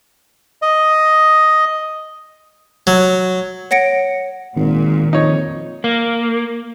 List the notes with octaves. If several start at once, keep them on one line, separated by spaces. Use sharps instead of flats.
D#5
F#3
C#5 F#5 A#6 C#7 D7
G#1 A#2 D#3
F2 D#4 C#5
A#3